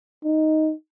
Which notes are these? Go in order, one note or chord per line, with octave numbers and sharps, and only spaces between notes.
D#4